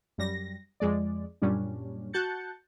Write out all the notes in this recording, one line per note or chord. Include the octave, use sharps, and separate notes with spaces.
F#2 G3 A#6
F2 G#3 D5
F#2 A#2 G3 C#4 D4
F#4 A5 F#6 G6 A6 C#7